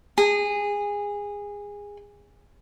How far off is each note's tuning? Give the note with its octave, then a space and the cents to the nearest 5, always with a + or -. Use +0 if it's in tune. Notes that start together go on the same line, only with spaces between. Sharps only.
G#4 -20